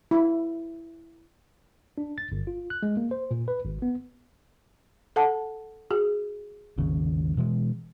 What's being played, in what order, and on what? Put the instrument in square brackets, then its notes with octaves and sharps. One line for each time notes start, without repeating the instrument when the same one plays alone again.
[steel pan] E4
[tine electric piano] D4
A6
G1
F4
F#6
G#3
A#3
C5
A#2
B4
G#1
B3
[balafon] A4 F#5 A5
F#4 G#4
[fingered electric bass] G#1 D#2 C#3
B2 E3 G#3